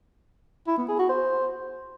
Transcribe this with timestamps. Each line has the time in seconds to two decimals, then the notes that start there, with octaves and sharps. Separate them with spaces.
0.68 E4
0.78 B3
0.88 G#4
0.99 F#4
1.09 C5